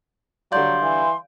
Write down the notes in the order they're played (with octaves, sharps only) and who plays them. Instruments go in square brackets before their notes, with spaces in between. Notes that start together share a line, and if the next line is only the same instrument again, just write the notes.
[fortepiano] D3 G3 D5 [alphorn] F#3 [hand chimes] F5 G6 [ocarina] C6
[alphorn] E3